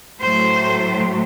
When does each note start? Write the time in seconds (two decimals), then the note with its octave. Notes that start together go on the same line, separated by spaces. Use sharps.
0.21 A2 F#3 A3 C5